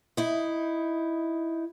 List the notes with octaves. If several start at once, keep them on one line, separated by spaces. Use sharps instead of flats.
D#4 E4